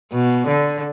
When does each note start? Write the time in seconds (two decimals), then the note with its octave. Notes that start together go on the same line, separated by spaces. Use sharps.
0.12 B2
0.48 D3